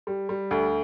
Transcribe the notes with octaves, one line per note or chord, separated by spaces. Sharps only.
G3
G3
D2